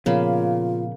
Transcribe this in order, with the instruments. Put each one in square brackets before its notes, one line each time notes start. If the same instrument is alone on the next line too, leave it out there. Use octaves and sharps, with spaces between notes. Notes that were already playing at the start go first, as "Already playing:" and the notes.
[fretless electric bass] A#2 F3 B3 [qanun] C#3 A#3 B5 [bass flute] F4